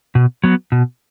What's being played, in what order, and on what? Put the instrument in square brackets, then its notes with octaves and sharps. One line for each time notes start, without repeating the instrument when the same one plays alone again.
[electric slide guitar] B2
F#3 B3
B2